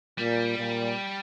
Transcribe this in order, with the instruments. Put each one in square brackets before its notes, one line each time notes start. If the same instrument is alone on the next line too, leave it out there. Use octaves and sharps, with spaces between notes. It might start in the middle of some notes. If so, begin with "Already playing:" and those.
[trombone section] A#2 [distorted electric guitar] G3
[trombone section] A#2